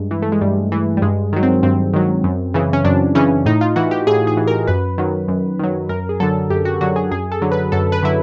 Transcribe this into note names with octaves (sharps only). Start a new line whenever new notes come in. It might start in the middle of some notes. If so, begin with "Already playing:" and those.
Already playing: G2 G#3
E3
A3
G#3
G2 G3
E3
G3
G2 G#3
D#3 F#3
C4
G2 C4
D#3 F#3
F#2
C#3 E3
C#4
F#2 D4
C#3 E3 C#4
A2 D#4
F4
E3 F#4
G4
A2 G#4
G#4
E3
A#4
F#2 B4
D#3 F#3
F#2
D#3 F#3
F#2 A#4
G#4
D3 F#3 A4
F#2 G4
F#4
D3 F#3 F#4
G#4
F#2 G#4
A4
D3 F#3
B4
F#2 A4
B4
D3 F#3 E4